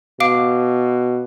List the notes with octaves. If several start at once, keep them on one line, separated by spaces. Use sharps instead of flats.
B2 F5 D6 D7